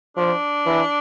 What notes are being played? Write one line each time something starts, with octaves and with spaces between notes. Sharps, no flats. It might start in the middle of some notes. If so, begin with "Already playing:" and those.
F3 D4
E3